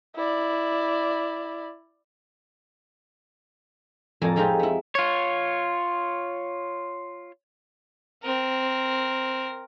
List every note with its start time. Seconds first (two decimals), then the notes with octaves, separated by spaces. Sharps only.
0.16 E4 D5
4.22 F2 A2 A#3 D5 G#5 A5
4.36 G#3 C4 D#4 F4 G4 G#4
4.59 B3 E4
4.95 F4 C#5
8.23 C4 A#4